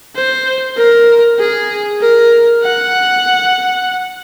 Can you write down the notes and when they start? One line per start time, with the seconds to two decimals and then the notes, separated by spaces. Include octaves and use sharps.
0.16 C5
0.77 A#4
1.40 G#4
2.02 A#4
2.64 F#5